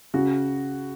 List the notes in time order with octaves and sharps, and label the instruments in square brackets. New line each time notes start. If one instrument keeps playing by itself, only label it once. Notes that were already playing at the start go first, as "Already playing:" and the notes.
[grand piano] C#3 F#4